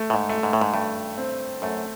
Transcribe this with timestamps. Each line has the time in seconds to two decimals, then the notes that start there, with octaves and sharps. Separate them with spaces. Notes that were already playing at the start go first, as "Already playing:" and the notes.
Already playing: A3
0.10 A2
0.14 G#2
0.29 A3
0.43 G#2
0.53 A2
0.61 G#2
0.74 G2 A3
1.18 C4
1.62 F#2 A3